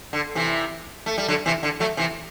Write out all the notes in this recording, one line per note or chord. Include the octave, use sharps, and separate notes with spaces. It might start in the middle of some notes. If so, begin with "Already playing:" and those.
D3
C3 E3
A3
G3
D3 F#3
C3 E3
D3
F#3 A3
C3 E3